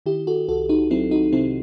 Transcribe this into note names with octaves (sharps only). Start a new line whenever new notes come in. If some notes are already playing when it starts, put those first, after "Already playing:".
D#3 E4 G4
F#4 A4
C2 F#4 A4
D#4 F#4
F#3 C4 E4
D#4 F#4
C3 C4 E4